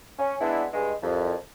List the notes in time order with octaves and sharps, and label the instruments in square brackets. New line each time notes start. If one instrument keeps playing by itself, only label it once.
[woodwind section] C#4
G#3 B3 D4 E4
G2 G#3
C2 F2